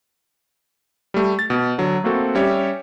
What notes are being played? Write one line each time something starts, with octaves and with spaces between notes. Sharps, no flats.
G3 A3
A6
B2
D3 F#3
A3 A#3 C4 F#4 A4
G3 C#4 G4 C#5 E5